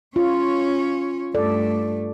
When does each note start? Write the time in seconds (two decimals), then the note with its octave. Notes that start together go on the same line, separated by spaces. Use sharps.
0.16 C#4 F4 C#5
1.35 G2 A3 A4 D5